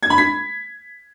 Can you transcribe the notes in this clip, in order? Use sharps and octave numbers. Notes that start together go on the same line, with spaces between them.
G#6
B5
B6